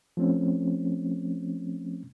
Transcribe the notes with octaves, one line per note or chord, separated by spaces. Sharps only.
F3 A3 C4 C#4